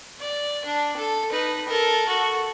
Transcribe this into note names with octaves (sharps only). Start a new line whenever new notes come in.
D5
D4
A4
D#4 B4
A4 A#4
F#4 A4